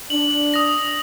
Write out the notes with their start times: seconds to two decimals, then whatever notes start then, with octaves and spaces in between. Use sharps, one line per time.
0.10 D4 F#7
0.54 D#6 A#6